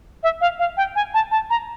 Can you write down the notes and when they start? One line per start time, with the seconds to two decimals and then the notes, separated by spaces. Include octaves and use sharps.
0.23 E5
0.41 F5
0.59 F5
0.77 G5
0.96 G#5
1.14 A5
1.31 A5
1.50 A#5